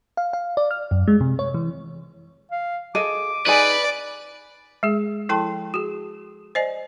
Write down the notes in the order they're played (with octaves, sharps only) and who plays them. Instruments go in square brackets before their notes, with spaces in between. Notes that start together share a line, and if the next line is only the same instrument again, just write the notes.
[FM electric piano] F5
F5
D5
F6
F#2
G#3
C3
C#5
E3
[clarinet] F5
[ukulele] G#4 A4 D#5 [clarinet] D6
[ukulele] D#4 G#4 G#5 [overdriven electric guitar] B4 [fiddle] D5
[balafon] G#3 G#4
F3 E4 A4 G5 A5 C6
F#4 G#4
C5 D5 D#5 G#5